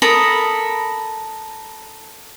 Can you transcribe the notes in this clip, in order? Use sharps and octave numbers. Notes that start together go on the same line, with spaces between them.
A4 A#4 B5 D#6